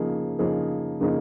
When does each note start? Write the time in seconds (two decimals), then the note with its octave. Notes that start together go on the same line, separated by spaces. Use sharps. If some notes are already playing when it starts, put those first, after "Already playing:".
Already playing: C#3 F3 A#3 D#4 G#4
0.39 C#3 F3 A#3 D#4 G#4
1.00 C#3 F3 A#3 D#4 G#4